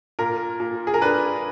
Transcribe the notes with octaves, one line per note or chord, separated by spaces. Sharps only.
A#2 A#4
A#2
G#4
A#4
D4 B4